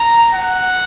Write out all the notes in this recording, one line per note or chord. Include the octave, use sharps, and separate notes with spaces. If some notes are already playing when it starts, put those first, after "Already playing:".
Already playing: A#5
F#5